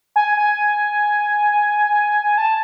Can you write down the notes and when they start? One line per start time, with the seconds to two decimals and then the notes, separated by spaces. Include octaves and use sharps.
0.16 G#5
0.37 G#5
2.38 A5